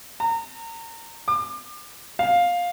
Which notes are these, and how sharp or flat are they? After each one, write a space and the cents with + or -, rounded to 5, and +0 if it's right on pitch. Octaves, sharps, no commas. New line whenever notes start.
A#5 -30
D6 +35
F5 +10